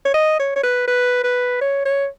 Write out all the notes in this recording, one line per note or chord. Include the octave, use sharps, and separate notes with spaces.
C#5
D#5
C#5
C#5
B4
B4
B4
C#5
C#5